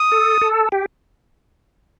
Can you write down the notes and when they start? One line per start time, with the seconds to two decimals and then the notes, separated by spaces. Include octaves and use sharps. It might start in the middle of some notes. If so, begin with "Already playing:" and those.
Already playing: D#6
0.12 A4
0.42 A4
0.72 G4